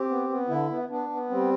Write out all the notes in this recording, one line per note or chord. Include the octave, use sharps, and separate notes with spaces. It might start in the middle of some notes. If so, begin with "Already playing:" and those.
Already playing: C4 G4
B3
B3
D3 E4
B3
B3 D4
B3
G3 C4